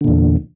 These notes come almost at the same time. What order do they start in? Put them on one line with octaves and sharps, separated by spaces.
D3 A#2 E2